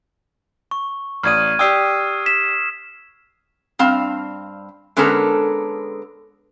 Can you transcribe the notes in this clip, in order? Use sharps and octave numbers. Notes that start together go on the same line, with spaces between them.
C#6
A1 D5 D#6 F6 G#6 D#7
G4 D5 G5 D#6 E6 C7
B6 E7
G2 C4 F5
D3 G#3 B3 C#4 A4 A#4